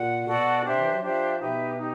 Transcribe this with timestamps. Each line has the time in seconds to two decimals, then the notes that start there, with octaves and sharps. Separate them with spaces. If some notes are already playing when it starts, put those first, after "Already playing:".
Already playing: A#2 F#5
0.21 C3
0.27 B2 F#4 A4 D5 F#5
0.65 C3 D4 G4 C5 E5
0.77 E3
0.91 F#3
1.02 F3 D4 G4 C5 E5
1.40 B2 D#4 G4 B4 E5
1.78 D#4 G4